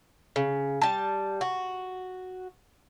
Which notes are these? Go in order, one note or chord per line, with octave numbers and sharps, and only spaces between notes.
C#3
G3 A5
F#4